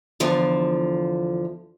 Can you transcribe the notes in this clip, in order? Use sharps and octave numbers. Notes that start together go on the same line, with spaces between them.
E2 D3 F3